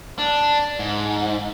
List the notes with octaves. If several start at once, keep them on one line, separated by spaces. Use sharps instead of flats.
D4
G#2